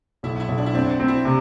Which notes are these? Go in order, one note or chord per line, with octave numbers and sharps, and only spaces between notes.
B1 E4
E4
B1
D4
E4
C4 D4
C4
E4
C3